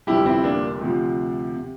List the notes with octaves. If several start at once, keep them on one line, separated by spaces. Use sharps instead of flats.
G1 F2 C3 G3 E4 G4
C4 E4
A#3 D4
D2 C3 F3
C3